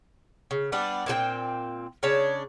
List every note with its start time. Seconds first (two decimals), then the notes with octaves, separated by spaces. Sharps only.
0.51 C#3
0.72 G3 B3 D4 F#5
1.06 A#2 C4 G#4 G5
2.03 C#3 D4 C#5 A5